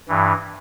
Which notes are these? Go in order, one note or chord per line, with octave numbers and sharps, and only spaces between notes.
G2 E3